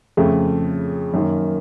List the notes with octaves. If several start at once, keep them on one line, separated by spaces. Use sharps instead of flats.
F2 C#3 A3
F#2 D#3 A#3